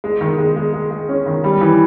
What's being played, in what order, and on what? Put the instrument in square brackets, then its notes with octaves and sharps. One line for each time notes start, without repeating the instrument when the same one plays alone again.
[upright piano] G#3
D#3
G#3
G#3
G#3
G#3
C#4
D#3
G3
E3